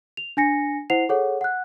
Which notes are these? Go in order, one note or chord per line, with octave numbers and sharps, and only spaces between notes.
F7
D4 G#5 A#6 C#7
E4 C5 F#5 C7 F7
G#4 A4 C#5 F#5
F#5 F#6